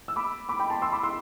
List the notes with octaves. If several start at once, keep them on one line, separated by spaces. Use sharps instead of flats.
E6
B5 D6
B5 D6
G5 B5
A5 C6
C6 E6
B5 D6
C6 E6